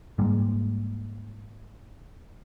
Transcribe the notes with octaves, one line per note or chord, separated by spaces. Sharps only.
G#2 G3 G#3 A#3